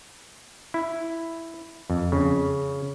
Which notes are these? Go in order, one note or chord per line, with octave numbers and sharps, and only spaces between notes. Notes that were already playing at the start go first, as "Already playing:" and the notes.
E4
F2
C#3